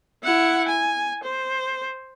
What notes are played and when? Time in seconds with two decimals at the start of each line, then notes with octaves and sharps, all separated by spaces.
0.24 E4 F#5
0.69 G#5
1.24 C5